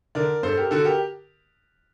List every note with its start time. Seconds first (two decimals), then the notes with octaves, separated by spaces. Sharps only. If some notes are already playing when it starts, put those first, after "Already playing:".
0.15 D3 A#4 D5
0.43 G2 A4 C5
0.57 G4 A#4
0.71 D3 F#4 A4
0.84 G4 A#4